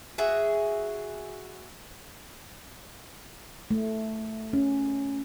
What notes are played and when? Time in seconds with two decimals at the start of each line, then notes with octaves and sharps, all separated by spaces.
0.18 F#4 G#4 E5
3.71 A3
4.53 C#4